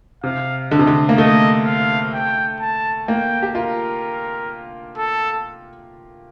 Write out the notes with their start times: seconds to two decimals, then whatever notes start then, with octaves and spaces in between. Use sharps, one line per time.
0.24 C3 F5
0.71 D3 D#5
0.79 C3
0.87 D3
1.09 A#3
1.18 A3 D#5
1.66 F5
2.13 G5
2.60 A5
3.08 A#3 G5
3.42 G4
3.55 F4 A#4
4.97 A4